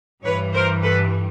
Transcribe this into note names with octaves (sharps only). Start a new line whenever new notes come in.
G2 E3 G3 B4 C#5
A#4 C5
A4 B4